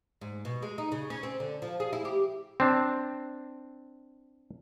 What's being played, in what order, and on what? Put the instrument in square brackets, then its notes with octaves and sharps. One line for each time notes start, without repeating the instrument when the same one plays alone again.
[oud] G#2
B2
G#3
D#4
C#3
C#4
C4
D3
F3
G#4
E4
G4
[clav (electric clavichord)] C4 D4